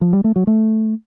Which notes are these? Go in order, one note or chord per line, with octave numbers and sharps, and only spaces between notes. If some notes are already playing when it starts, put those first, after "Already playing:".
F3
G3
A3
F#3
A3